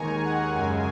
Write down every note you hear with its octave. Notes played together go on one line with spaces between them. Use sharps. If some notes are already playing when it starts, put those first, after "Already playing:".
Already playing: D#2 D#3 G#3 G#5 A#5 C#6
F#5
F#2 C#3 G#3 G#5